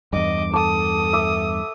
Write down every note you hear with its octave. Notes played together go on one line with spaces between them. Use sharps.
E2 G2 D#5 D6
A4 A5 D6 D#6
E5 D6